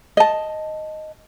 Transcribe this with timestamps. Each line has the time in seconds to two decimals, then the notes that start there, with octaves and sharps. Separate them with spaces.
0.17 D#5 A5